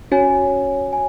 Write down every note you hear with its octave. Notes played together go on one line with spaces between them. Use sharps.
C#4 F#4 C#5 G#5
G#5